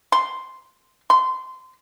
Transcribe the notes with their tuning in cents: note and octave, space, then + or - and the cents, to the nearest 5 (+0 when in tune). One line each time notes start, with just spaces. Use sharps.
C6 +0
C6 -20